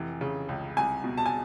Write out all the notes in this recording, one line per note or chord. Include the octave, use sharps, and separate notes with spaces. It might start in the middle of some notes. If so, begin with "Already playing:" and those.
Already playing: F1 E3
C#3
C#2
C2 G#5
B2
A5
G#5